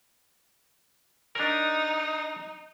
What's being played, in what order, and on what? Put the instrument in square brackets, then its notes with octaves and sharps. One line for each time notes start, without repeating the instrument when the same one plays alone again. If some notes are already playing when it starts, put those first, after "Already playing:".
[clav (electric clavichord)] D4 A#4 [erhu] D#4